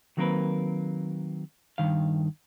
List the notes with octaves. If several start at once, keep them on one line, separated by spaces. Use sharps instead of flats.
D#3 F#3 A#3 C4 A#4 B4
G2 D#3 F5